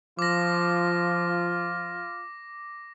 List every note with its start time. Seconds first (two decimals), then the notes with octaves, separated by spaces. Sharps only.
0.19 F3 F4 D6 A#6